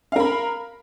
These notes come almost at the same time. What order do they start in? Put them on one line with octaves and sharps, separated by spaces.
F5 A#4 B5